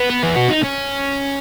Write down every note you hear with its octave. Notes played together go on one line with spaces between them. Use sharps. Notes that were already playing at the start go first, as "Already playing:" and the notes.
Already playing: B3
B4
G#4
F#4
D#4
C#4